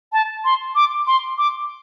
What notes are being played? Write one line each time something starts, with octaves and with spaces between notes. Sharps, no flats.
A5
C6
D6
C6
D6